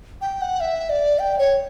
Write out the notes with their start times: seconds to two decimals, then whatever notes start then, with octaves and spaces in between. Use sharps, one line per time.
0.21 G5
0.42 F#5
0.60 E5
0.90 D5
1.19 G5
1.39 C#5